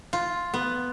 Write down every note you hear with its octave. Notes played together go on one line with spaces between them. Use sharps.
F4
B3